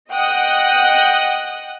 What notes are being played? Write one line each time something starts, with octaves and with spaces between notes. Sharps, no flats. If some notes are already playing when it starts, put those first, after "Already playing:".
D#5 F#5 G5 D#6 F#6